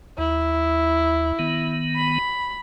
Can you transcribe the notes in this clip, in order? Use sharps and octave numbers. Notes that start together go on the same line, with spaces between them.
D#2 E4
D#3 B3
B5